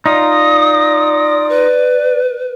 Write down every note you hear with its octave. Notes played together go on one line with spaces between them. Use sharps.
D#4 F4 D5 D#6
B4